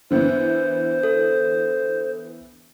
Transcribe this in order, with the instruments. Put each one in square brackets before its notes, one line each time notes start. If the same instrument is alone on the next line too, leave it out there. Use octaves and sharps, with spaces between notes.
[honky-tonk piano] D3 E3 B3 [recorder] C5
[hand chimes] A4